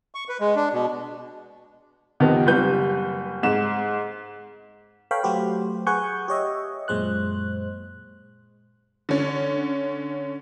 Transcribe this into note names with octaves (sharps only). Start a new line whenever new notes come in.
C#6
B4
G#3
D4
B2
F2 C3 D#3 B3
F#1 G3 B4 G6
G#2 E7
A4 B4 C#5 F5 G5 B5
F#3 A3 F#4 G4 B4 C5
G#4 B4 F#5 G#5 C#6 G6
G4 C#5 D#5 E5
F#2 A#2 G#3 C5 F#6
D3 C#4